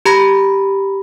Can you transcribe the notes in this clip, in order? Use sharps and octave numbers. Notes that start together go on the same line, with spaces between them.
G4 A#5 B5 A#6